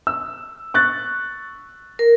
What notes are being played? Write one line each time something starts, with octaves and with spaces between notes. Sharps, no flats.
E6
C#6 F#6 A6
A#4